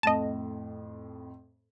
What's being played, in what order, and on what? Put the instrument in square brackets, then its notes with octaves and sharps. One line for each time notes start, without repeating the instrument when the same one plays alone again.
[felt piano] F2 A2 [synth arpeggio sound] D#5 A5